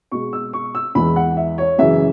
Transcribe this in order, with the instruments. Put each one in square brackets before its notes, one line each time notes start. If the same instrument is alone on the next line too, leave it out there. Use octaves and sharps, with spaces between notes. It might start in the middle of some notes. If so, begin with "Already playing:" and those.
[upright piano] B2 G#3 C#6
E6
C#6
E6
E2 E3 G#3 B5
F#5
E5
C#5
F#2 C#3 E3 G#3 E5